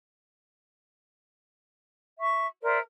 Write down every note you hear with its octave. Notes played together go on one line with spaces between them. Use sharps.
E5 C#6
A#4 C5 D5 E5